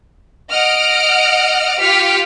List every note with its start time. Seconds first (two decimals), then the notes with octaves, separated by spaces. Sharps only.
0.51 D#5 F#5 F6 D7
1.80 F4 G4 F6 B6 C#7